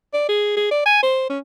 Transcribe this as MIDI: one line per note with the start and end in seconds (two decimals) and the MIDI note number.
0.13 0.26 74
0.28 0.52 68
0.56 0.70 68
0.71 0.83 74
0.85 0.99 80
1.03 1.26 72
1.30 1.39 61